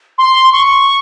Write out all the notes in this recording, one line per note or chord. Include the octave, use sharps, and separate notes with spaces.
C6
C#6